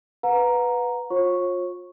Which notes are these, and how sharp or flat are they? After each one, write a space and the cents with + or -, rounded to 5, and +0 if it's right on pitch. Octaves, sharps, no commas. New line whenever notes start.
B4 +0 F#5 -40 A#5 +0
F4 +30 C#5 -40 C#6 +0